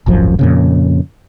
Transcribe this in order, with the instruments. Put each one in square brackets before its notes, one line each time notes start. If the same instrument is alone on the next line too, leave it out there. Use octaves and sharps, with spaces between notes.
[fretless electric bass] D1 G#1 F#2 F3
F2 A#2 C#3